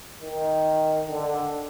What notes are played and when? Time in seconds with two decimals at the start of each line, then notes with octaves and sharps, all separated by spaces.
0.22 D#3
1.09 D3